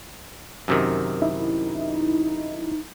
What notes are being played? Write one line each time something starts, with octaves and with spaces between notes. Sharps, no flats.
F#2 C3 D#3
D#4 E4